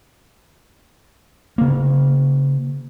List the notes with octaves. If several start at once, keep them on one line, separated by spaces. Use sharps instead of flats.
C#3 A#3